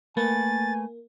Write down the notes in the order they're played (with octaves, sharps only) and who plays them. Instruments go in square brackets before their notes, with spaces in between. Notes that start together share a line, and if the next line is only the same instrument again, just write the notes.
[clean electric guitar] A3 B4 [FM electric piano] A#3 [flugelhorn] G#5 [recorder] A6